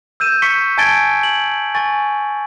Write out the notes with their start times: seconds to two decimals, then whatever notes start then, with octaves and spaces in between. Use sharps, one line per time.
0.20 E6 G6 D#7 E7
0.42 C#6 B6 C#7 G7
0.78 G#5 A5 G#6 A6 D7 G7
1.23 F#7
1.75 G#5 C#6 A6